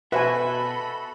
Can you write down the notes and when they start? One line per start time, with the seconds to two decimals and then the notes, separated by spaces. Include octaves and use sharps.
0.12 B2 F#4 A4 B4 C5 E5 G#5 B5